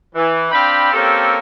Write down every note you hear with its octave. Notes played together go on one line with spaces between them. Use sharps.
E3
C4 D4 F5 G5 B5
A#3 C4 C#4 G4 A4